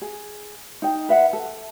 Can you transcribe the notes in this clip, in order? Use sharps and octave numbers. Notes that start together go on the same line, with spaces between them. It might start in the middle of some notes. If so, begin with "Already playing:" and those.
G#4
D#4 G5
B4 E5 F#5
A4